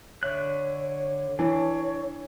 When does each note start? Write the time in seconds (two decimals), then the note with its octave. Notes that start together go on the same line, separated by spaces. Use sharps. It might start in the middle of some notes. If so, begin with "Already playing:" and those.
0.23 D3 C#5 E5 F#6
1.39 E3 D4 C#5